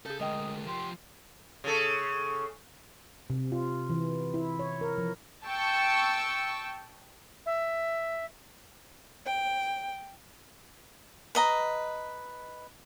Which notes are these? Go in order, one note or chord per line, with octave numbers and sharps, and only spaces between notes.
C#3 G#4 A4 G6
D2 G#3 A#4 D#5 G5 D#6
F3 G4 C6
C#3 A4
C3
F4
E3
E4
C#5
A#4
F3
G5 A5 C#6 E6
E5
G5
B4 D#5 A#5